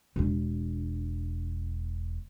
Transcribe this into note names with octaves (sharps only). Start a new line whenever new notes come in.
E1 D4